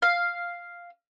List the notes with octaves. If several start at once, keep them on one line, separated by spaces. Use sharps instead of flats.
F5